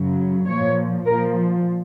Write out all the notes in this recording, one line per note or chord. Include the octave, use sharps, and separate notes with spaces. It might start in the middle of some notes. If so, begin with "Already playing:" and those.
Already playing: F#2 C#3 F#3
A#2 F3 C#5
A#2 F3 A#4